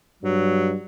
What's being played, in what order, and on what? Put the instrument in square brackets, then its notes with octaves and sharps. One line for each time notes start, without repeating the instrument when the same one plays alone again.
[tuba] G2 [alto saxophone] F#3